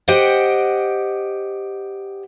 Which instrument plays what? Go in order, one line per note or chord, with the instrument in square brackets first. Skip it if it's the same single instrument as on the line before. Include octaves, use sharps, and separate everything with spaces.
[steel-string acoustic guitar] G4 C5 D#5 F#5 G5